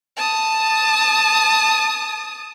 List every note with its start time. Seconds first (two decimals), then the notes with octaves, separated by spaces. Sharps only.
0.17 A5 D#6